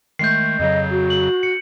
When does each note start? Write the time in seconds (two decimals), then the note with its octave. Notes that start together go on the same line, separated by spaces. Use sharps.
0.19 D#3 G#3 A3 G6 C7
0.59 F2 C#3 F#3 D#5
0.91 F#4
1.10 F#7
1.43 C#7